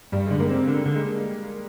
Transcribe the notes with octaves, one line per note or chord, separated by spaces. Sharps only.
G2 G3
D3 G#3
A#3
C4
D3
D3
G#3